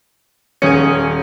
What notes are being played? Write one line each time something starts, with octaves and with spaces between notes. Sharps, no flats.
D#1 C#4 G#4 G#5 C#7